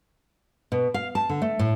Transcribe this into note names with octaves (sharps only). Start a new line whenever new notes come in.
B2
F5
A5
D3
A3
A2